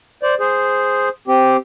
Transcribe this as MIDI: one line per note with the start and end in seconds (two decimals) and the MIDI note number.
0.23 0.35 72
0.23 0.35 74
0.40 1.09 68
0.40 1.09 72
1.28 1.57 60
1.28 1.57 67